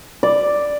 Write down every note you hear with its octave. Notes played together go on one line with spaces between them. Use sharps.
D5